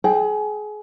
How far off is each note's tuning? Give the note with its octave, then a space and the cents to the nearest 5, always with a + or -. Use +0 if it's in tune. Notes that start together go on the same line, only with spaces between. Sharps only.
G#4 +30 G5 +0